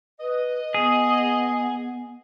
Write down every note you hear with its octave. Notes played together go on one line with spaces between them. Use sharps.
B4 D#5
B3 G#4